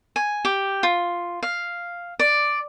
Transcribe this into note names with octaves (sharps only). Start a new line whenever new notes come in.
G#5
G4
F4
F5
D5